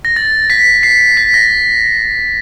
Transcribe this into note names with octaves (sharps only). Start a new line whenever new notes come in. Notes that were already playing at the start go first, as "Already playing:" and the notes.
A#6
A6
B6
C7
B6
A#6